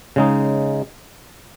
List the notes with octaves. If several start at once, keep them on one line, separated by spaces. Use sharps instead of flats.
C#3 G#3 D#4